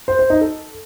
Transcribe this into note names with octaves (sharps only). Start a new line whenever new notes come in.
C5
C5
D#4
A4